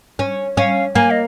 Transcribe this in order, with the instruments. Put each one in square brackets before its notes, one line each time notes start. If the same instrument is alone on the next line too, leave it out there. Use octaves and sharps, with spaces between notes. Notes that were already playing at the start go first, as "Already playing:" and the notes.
[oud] C#4
[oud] C#4 [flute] F5
[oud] A#3 [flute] G#5
[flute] D#5